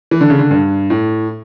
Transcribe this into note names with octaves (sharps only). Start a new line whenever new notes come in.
E3
D3
C#3
D3
G2
A2